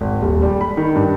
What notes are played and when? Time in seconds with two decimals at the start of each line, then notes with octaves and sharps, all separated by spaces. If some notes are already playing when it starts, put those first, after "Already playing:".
0.01 G#1
0.22 D#1
0.42 G3
0.61 B5
0.77 D#3
0.95 G2